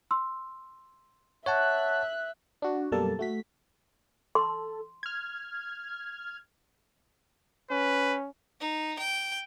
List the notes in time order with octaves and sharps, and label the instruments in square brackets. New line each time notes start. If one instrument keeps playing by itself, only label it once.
[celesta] C6 E6
[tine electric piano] C#5 F#5 A5 [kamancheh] E5 [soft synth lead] F#6
[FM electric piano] D4 F#4
F#2 B2 G3 A#3 A4 A5
A3 F#4 B6
[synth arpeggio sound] A4 [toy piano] C6
[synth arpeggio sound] F6 G#6
[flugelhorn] C#4 [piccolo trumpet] B4
[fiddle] D#4
G5